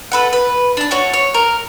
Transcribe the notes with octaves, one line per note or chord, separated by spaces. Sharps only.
A4 B4 F#5
B4
D4 A5
A3 F#4 C#5
C#5
A#4